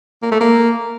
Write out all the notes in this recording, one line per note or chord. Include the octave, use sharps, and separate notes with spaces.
A#3
A3
A#3